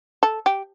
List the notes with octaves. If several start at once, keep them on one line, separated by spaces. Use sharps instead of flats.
A4
G4